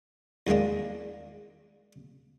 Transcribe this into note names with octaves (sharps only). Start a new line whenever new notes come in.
E2 D#3 G#3 A#3 D4